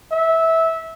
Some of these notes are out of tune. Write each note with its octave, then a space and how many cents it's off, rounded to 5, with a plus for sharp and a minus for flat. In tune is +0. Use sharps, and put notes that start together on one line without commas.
E5 -15